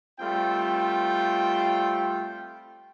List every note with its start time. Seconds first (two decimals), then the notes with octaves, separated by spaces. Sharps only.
0.20 G3 A3 C4 F4 G5